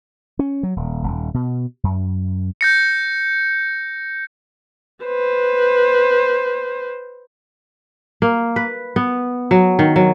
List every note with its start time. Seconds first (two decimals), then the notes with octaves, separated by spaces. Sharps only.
0.39 C#4
0.63 F#3
0.76 D#1
1.03 D#1
1.34 B2
1.84 F#2
2.61 G6 A#6 C#7
5.04 B4 C5
8.22 A#3
8.56 B4
8.96 B3
9.51 F#3
9.79 D#3
9.96 F#3